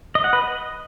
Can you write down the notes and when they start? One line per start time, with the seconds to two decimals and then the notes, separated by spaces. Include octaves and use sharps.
0.15 D#5
0.24 F#5
0.33 B4
0.42 D#5